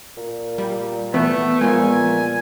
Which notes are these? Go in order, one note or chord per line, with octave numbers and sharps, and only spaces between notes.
A#2
G3
E3 A3 B3
A#2 F3 G#3 G#5